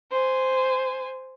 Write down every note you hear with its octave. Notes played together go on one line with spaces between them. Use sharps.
C5 G#5